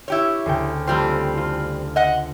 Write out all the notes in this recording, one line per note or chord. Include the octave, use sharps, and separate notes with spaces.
E4 G4 C#5
D2 C#3 G5
F2 G3 A3 C4 F4
F4
D#5 F#5